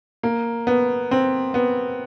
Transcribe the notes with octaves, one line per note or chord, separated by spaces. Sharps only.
A#3
B3
C4
B3